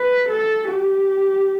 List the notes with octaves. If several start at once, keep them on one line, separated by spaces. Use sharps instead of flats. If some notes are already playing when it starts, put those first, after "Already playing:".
Already playing: B4
A4
G4